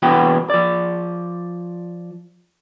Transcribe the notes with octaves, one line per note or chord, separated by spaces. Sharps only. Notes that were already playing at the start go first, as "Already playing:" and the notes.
C2 E3 B3 F#4 B4 G5
F3 D5